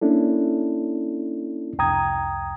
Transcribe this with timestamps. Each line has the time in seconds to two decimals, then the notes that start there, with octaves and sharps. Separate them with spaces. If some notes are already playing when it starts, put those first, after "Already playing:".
0.01 A#3 C#4 D4 E4 A4
1.78 C2 F2 G5 A#5 D#6 G#6